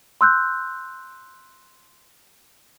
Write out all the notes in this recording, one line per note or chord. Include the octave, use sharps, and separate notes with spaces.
C6 E6 F#6 G6